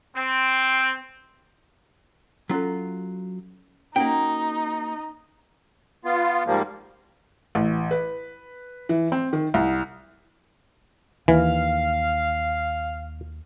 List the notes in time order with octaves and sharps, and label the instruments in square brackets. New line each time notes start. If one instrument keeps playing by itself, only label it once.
[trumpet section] C4
[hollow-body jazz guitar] F#3 F4 [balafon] C#4 A4
[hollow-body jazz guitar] A#3 F#4 G5 [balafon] C#4 [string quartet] D#4
[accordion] B3 F4
G#2 F3 G3 A#3
[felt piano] A1
B4
E3
C4
D#3
C2
[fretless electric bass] D#2 [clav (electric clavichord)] E3 [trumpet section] F5